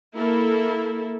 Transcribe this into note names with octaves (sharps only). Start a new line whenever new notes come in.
A#3 E4 A4